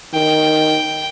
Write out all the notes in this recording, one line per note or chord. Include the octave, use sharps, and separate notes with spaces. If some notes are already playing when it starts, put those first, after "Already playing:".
D#3 G5